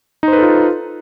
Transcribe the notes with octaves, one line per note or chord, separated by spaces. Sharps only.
D#4 F4 A4 B4 C5